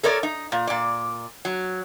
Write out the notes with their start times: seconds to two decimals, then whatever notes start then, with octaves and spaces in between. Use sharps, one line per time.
0.03 A4 A#4 C#5 D5
0.23 D#4
0.52 A#2
0.67 A#2 D5
1.45 F#3